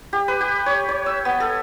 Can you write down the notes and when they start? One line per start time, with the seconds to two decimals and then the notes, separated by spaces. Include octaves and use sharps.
0.13 G4
0.28 B4
0.41 G4
0.66 C#5
0.88 C#5
1.06 E6
1.25 B3
1.40 A4